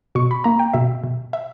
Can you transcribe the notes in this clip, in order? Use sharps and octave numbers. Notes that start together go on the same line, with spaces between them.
B2 C#6
B5
A#3 A#5
G5
B2 E5
B2
E5